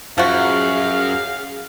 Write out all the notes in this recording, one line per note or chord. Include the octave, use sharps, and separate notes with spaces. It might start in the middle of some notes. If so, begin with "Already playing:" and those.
F#2 F3 F#4 G#4 F5